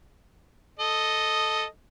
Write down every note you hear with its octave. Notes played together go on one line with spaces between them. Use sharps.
A4 D#5